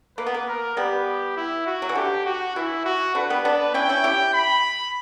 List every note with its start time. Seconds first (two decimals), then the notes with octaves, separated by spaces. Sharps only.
0.18 A#3 B4
0.26 B3
0.34 A#3
0.47 A#4
0.77 G3 B3 G4
1.37 E4
1.66 F#4
1.82 F#3
1.89 E3
1.95 D3 G4
2.26 F#4
2.56 E3 E4
2.85 F#4
3.15 D3 B4
3.30 G3 B3
3.45 B3 D4
3.74 C#4 E4 G5
3.89 C#4 E4
4.04 E4 G4
4.34 B5